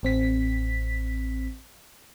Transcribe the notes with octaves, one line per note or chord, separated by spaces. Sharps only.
A1 C4 B6